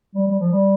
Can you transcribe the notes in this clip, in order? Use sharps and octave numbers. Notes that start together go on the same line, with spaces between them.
G3
G3
F3
G3